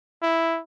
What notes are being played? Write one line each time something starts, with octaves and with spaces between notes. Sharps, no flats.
E4